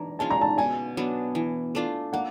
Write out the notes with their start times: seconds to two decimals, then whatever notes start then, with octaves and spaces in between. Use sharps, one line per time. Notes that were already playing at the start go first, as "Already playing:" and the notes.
Already playing: E3 D4 A#5
0.19 G#3 C#4 F4 A5
0.31 A#5
0.42 A5
0.58 B2 G#5
0.97 F#3 B3 D4
1.35 E3
1.75 A3 D4 F4
2.13 A#3 F#5